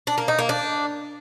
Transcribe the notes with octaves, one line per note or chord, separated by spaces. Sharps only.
D4
A#3
D#4
A#3
D4